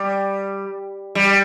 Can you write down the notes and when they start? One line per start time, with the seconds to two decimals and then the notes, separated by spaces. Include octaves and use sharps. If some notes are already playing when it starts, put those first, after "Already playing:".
Already playing: G3
1.15 G3